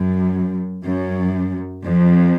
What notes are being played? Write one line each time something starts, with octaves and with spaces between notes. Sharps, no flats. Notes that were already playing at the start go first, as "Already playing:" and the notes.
Already playing: F#2
F#2
F2